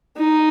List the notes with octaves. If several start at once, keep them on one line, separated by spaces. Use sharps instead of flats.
D#4